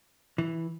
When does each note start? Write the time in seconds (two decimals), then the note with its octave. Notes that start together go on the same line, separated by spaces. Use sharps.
0.38 E3